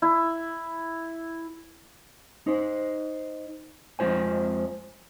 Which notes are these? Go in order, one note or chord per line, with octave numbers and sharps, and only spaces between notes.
E4
D#4 C5
F2 G#3 F4 C5 G#5